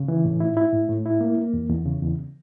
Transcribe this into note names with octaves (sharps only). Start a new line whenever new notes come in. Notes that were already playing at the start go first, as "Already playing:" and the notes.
Already playing: C#3
E3
A2
E4
E4
A2
A2
E4
A#3
A#3
E2
E2
C#3
E2